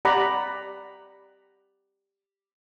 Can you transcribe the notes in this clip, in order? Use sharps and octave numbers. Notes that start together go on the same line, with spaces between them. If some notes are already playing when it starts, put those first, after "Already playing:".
G4 D5 F#5 A#5 B5